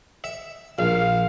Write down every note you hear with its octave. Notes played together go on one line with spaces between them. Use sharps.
E5
A#1 F5